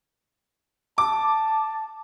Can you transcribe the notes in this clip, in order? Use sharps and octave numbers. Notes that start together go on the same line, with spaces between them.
A5 D6